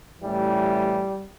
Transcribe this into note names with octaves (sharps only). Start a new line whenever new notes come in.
A1 A2 E3 G3